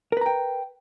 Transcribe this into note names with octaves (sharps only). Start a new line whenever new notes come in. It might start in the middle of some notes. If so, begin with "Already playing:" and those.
A#4 B4 G5 A#5